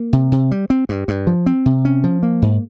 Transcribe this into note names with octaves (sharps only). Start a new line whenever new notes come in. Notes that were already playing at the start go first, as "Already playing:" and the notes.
Already playing: A#3
C3
C3
G3
C4
G2
G2
F3
C4
C3
C#4
F3
A#3
G#2